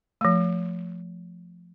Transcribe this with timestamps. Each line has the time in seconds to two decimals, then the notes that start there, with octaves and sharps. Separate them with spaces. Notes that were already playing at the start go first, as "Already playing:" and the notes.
0.21 F3 A3